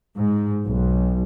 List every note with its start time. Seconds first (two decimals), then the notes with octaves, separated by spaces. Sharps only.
0.18 G#2
0.66 B1